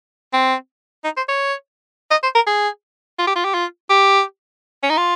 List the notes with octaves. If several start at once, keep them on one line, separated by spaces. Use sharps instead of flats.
C4
D#4
C5
C#5
D#5
C5
A#4
G#4
F4
G4
F4
G4
F4
G4
C#4
D#4
F4